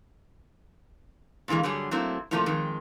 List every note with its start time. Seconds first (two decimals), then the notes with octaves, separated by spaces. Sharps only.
1.48 A#2 D3 E3 G#3 A#3
1.63 D3 F#3 G3 G#4
1.91 F#3 A3 A#3 C4 E4
2.31 A2 C3 F3 A3 A#3
2.46 F2 D#3 G#3